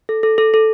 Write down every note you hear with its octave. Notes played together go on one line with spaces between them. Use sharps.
A4
A4
A4
A4